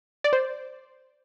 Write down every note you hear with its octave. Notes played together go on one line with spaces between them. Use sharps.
D5
C5